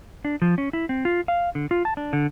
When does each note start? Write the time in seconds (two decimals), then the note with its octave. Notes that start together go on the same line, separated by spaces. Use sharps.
0.25 D4
0.42 F3
0.58 C#4
0.73 E4
0.89 C4
1.05 F4
1.28 F5
1.55 D3
1.71 F4
1.85 A5
1.97 D4
2.13 D3